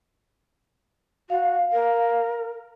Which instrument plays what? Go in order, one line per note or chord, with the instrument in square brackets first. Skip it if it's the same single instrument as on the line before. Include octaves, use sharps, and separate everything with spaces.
[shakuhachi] F#4 [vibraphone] F5
[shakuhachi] A#4